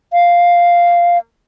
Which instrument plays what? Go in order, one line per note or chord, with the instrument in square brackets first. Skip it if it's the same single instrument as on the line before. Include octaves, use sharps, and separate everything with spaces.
[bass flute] F5